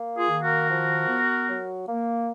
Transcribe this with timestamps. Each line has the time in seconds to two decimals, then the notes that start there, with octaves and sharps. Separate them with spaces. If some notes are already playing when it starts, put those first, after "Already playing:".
Already playing: A#3
0.17 F4 G#4
0.31 D#3
0.43 F#4 A#4
0.70 F3
1.09 B3
1.49 F#3
1.88 A#3